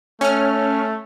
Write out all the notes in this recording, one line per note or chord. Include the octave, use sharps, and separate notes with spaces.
A3 C#4 F6